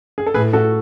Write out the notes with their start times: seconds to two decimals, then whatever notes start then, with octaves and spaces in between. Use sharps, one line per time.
0.18 G#4
0.26 A4
0.34 A2 G#4 B4
0.53 F#4 A4